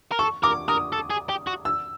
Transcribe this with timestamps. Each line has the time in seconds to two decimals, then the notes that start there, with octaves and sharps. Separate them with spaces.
0.11 A#4
0.19 A4 C#6
0.43 A#4 D6
0.68 A#4 D#6
0.93 A4
1.10 G#4
1.29 G4
1.47 F#4
1.65 E6